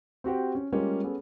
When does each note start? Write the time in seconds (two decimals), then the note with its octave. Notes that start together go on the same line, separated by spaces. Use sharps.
0.24 C4 F#4 G4 C5
0.55 C#4
0.72 G3 G#3 A#3 C#4 F4
1.04 B3 C#4 G#4 A4